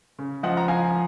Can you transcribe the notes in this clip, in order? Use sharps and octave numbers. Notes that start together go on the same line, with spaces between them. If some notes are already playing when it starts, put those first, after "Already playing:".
C#3
F3 D#5 F#5
A#5
F3 F5 G#5